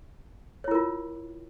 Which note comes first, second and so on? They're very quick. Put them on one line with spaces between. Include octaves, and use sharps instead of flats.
C#5 E4 A#4 F4